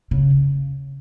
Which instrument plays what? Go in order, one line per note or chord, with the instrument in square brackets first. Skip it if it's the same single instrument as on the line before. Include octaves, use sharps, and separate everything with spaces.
[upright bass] C#3